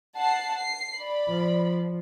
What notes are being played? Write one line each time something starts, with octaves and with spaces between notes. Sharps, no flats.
F#5 A5 C7
C7
D5 B5
F3